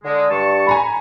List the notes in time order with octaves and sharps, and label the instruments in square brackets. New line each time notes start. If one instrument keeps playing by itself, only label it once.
[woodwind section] D3 G#3
G2 A5 C#6
[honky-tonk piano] G#5 A#5 B5